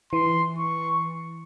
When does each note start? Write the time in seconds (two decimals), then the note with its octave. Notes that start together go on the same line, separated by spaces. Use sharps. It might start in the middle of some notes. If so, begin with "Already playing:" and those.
0.13 E3 C6
0.58 C#6